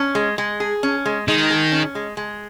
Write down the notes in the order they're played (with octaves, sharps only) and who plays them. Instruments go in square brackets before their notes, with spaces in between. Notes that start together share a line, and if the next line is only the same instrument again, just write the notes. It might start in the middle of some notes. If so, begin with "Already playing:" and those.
Already playing: [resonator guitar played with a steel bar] C#4
G#3
G#3
G#4
C#4
G#3
[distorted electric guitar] D#3 [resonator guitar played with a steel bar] G#3
[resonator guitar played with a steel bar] G#4
C#4
G#3
G#3